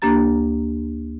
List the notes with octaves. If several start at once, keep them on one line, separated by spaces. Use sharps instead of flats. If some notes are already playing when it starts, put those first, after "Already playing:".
D2 A#3 D4 G4 A#5 A6